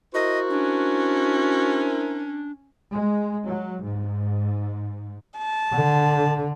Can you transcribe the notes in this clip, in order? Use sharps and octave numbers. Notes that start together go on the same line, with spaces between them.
E4 F#4 A#4 C5 D#5
C#4 D4
G#3
F#3
G#2
A5
D3